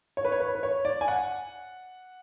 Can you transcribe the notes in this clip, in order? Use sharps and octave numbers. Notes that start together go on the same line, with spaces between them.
C#5
B4
C#5
B4
B4
C#5
D5
G#5
F#5